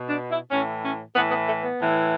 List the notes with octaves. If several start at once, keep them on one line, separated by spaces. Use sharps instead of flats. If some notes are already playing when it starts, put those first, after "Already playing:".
Already playing: B2
D4
E4
A2 E3 C#4
C#4
A2 E3 B3
B3
A3
B3
A2 E3